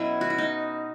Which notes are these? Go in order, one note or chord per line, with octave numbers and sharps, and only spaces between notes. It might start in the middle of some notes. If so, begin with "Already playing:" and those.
Already playing: B2 F#3 C#4 E4
F#4
E4
D#4